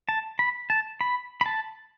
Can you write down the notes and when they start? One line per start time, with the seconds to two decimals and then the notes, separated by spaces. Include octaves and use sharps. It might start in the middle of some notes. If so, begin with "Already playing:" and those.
0.09 A5
0.39 B5
0.70 A5
1.01 B5
1.41 B5
1.46 A5